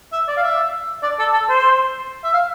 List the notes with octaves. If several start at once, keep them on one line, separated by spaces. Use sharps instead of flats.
E5
D5
F5
E5
D5
A4
A4
C5
E5
F5